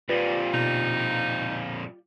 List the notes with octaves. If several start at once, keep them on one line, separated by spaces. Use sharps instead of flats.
F2 A#2 F4 G4 B4 D5
B2 D#4